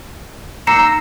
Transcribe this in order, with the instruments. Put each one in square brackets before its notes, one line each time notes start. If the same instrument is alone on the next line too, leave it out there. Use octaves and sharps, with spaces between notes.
[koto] A#3 D#4 [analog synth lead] A#5 [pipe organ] E6 [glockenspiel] A#6 C7 C#7